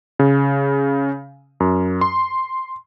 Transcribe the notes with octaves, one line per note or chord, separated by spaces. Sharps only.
C#3
F#2
C6